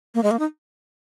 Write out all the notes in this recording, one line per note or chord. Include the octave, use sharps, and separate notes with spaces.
A#3
G#3
A#3
D#4